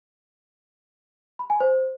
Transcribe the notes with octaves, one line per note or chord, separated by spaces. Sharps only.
B5
G#5
C5